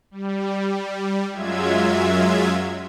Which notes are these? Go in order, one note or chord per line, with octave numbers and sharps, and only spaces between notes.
G3
F#2 F#3 G#3 F4 E5 G#6